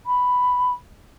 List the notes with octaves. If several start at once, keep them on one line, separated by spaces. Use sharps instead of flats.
B5